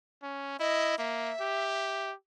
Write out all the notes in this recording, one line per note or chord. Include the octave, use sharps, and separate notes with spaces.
C#4
E4 D#5
A#3 E5
G4